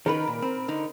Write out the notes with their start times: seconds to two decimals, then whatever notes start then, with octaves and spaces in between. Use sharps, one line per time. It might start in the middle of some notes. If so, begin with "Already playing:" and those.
0.06 D#3 D#4 A#4 B4 B5
0.27 A#2
0.42 C4
0.68 D3 D#4